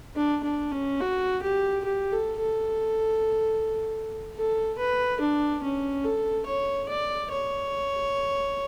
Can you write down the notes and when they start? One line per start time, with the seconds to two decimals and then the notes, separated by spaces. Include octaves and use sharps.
0.16 D4
0.43 D4
0.72 C#4
1.01 F#4
1.42 G4
1.85 G4
2.12 A4
2.40 A4
4.36 A4
4.78 B4
5.21 D4
5.63 C#4
6.04 A4
6.46 C#5
6.89 D5
7.31 C#5